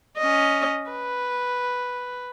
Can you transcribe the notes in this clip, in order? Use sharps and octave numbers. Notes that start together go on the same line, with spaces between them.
C#4 D#5
B4